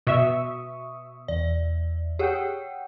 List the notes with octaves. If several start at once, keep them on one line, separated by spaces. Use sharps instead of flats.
B2 E5 C#6 D#6
E2 D5
G4 G#4 C#5 F#5 G5